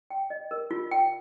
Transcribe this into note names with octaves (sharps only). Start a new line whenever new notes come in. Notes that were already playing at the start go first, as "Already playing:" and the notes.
G5
D#5
A#4
F4
G5